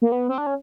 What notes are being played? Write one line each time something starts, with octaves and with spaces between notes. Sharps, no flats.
A#3
B3
C4
D4
C#4